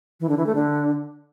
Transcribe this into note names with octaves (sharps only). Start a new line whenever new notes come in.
E3
D3
E3
A3
D3